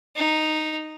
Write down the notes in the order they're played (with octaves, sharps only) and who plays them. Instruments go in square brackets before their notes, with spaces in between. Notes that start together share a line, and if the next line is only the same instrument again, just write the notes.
[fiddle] D#4